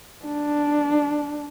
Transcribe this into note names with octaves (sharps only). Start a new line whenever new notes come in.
D4